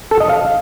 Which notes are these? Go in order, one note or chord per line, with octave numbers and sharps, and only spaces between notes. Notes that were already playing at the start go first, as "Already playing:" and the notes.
A4
D#5
F5